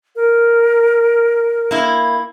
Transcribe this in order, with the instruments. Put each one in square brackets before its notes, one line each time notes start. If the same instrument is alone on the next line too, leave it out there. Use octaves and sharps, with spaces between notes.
[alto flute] A#4
[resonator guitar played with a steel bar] A#3 E4